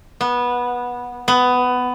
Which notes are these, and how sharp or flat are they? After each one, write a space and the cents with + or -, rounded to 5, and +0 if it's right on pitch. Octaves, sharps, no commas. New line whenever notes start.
B3 -15
B3 +15